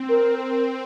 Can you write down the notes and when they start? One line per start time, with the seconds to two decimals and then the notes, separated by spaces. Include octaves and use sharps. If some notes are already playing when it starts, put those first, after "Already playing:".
Already playing: C4
0.09 A#4